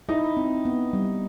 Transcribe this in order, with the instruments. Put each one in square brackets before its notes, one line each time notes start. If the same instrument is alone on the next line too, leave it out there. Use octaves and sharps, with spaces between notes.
[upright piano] D#4 [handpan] E4
[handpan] C4
B3
G3